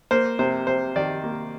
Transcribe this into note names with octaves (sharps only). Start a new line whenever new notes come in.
A#3 C5
C3 C5
C3 C5
D#3 D5
A#3